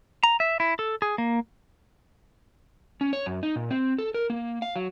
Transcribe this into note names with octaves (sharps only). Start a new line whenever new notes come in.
A#5
E5
E4
A4
G#4
A#3
C#4
C#5
F#2
D#4
A#2
C4
A4
A#4
A#3
F5
F#3